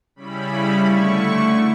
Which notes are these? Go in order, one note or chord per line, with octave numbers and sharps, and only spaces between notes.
C#3 G3 C#4 E4 B5
D3 A3 E4 C#6